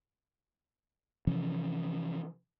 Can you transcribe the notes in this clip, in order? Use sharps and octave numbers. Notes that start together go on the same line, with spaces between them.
C3 E3 F3 C#4